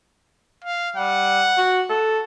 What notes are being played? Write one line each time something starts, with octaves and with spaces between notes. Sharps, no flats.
F5
G3 F#5
F#4
A4